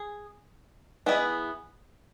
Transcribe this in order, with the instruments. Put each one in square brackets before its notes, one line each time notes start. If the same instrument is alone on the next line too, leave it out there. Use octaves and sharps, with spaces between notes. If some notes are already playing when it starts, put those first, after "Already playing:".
Already playing: [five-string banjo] G#4
E3 B3 E4 G#4 D#5